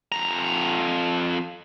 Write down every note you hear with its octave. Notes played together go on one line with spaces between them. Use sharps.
F2 A#5